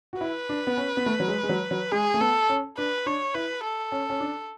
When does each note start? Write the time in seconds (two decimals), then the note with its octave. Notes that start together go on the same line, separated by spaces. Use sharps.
0.13 F#4
0.21 E4 B4
0.49 D4
0.67 B3
0.77 C#4
0.97 B3
1.06 A3
1.20 F#3
1.28 G#3
1.43 G#3
1.49 F#3
1.71 F#3
1.91 G#3 G#4
2.14 A3
2.20 B3 A4
2.49 C#4
2.78 D4 B4
3.06 D4 C#5
3.34 E4 B4
3.64 A4
3.92 C#4
4.10 C#4
4.20 D4